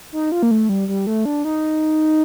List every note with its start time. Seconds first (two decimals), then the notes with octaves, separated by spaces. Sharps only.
0.12 D#4
0.32 F4
0.43 A#3
0.51 A3
0.69 G3
0.88 G3
1.07 A3
1.25 D4
1.45 D#4